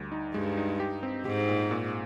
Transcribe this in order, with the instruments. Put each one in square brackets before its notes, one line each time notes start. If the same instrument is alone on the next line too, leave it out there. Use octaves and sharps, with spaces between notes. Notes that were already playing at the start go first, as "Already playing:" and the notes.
Already playing: [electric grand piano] D2 G3
D#4
[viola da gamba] G2 [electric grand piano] G#3
[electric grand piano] D#4
G4
C4
[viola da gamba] G#2 [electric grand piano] G4
[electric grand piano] A#2
A#2